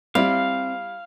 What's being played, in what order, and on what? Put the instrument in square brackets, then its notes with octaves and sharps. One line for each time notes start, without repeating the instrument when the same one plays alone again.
[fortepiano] G3 E4 [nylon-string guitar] C4 [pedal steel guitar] F5